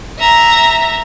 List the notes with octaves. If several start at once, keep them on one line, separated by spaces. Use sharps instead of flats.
E5 A#5